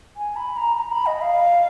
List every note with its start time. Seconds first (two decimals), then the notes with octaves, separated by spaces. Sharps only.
0.17 G#5
0.36 B5
0.57 A#5
0.77 A#5
0.91 B5
1.06 D#5
1.21 F5